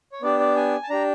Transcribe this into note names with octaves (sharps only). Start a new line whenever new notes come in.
C#5
B3 D4 G4 D5
D5
G#5
A5
D4 G4 A#5